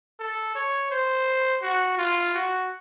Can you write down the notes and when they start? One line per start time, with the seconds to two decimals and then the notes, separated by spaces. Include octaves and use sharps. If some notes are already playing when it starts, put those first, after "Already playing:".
0.20 A4
0.55 C#5
0.91 C5
1.62 F#4
1.98 F4
2.34 F#4